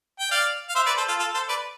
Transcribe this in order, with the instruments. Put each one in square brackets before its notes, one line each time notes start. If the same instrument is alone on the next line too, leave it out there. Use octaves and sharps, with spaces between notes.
[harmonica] G5
D5 F5
F5
C5 E5
B4 D5
A4 C5
F4 A4
F4 A4
A4 C5
B4 D5